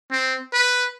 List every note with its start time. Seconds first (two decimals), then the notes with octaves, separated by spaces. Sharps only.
0.11 C4
0.53 B4